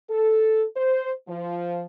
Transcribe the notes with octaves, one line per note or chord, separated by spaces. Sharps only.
A4
C5
F3